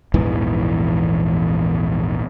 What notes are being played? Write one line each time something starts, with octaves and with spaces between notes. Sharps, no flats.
A#1 E2 G#2 E3